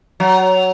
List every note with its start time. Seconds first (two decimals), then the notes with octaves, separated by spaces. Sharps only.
0.20 F#3